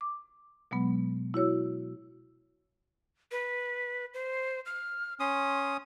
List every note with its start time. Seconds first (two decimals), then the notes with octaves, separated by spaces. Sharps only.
0.01 D6
0.71 B2 F#3 G#3 B3
1.34 E4 F#4 C#5 E6
3.32 B4
4.14 C5
4.66 F6
5.20 C#4 C6 D#6